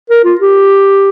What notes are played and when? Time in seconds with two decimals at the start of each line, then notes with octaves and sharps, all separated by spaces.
0.10 A#4
0.25 F4
0.41 G4